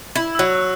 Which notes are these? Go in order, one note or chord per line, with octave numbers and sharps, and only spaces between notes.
E4
E6
F#3 F#6